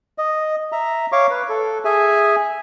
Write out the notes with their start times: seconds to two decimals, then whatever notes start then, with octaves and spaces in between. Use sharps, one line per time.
0.18 D#5
0.72 E5 A#5
1.12 C#5 F5 C#6 D6
1.30 B4
1.49 A4
1.85 G#4 E5 G#5